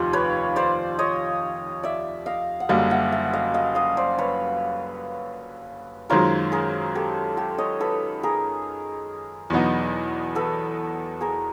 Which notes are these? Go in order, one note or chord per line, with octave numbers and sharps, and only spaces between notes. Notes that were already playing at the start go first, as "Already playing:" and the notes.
Already playing: F1 D#2 F4 G4
B4 C#5
C5 D5
C#5 D#5
D5 E5
D#5 F5
F#5
F#1 F#2 D3 G3 A#3 D#5 F5
E5 F#5
E5 F#5
D#5 F5
D#5 F5
D#5 F5
C5 D5
B4 C#5
F#2 D#3 G#3 C#4 F4 A#4 C5
G#4 A#4
G4 A4
G4 A4
C#5 D#5
A4 B4
G#4 A#4
E2 B2 F#3 B3 D#4
A4 B4
G#4 A#4